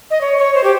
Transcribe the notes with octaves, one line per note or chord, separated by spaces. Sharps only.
D#5
C#5
C#5
C5
G4